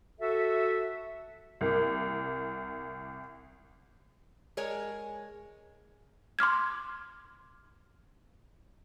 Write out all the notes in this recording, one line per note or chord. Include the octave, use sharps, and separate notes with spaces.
F#4 A4 E5
C2 A#3
G#3 A#4 C#5 G#5
C6 D6 F6 G#6